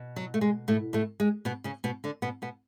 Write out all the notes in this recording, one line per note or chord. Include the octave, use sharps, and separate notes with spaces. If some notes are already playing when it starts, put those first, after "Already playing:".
Already playing: B2
F#3
A3
G#3
A2 A3
A2 A3
G#3
B2 B3
C#3 C#4
B2 B3
D3 D4
B2 B3
B2 B3